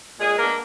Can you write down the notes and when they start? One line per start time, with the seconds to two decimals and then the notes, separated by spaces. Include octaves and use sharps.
0.18 A#2 G#3 G#4
0.38 G#3 A#3 B3 D4 A#4